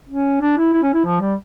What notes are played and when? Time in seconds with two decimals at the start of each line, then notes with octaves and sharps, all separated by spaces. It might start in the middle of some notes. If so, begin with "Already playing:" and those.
0.09 C#4
0.41 D4
0.57 E4
0.73 E4
0.83 C#4
0.94 E4
1.05 F3
1.20 G3